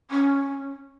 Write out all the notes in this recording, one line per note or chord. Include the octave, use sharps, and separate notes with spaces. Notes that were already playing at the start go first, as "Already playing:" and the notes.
C#4